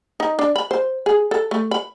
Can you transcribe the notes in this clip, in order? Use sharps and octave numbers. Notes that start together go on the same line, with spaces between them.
D#4
D4
B5
C5
G#4
A4
A3
B5